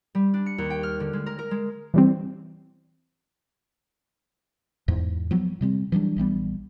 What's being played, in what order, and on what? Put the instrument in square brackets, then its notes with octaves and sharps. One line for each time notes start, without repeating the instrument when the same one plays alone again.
[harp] G3
D4
C#7
D#2
G5
F6
D3
G#3
A#4
A#4
G#3
[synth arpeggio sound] E3 G3 C4
[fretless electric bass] E2 G#2
F3 F#3 B3
C3 G3 A#3 C4
E3 F#3 G3 D4
A#1 E3 G3 B3